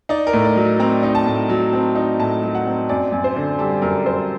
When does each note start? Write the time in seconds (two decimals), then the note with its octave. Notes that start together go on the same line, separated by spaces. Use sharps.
0.09 D#4 D5
0.27 A#4
0.33 A2
0.44 D5
0.56 F#3
0.79 C4 A#5
1.03 D#4
1.15 A5
1.26 A2
1.49 F#3
1.73 C4
1.95 D#4
2.19 A2 A5
2.43 F#3
2.55 F#5
2.66 C4
2.89 F#2 D5
3.12 F#2
3.24 C5
3.36 D3
3.59 G3 A4
3.82 F#2 A#4
4.05 F#2 C5